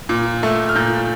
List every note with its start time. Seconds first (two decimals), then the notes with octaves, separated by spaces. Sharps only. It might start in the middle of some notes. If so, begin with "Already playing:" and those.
0.09 A#2
0.43 A3
0.69 F6
0.76 A#2 G6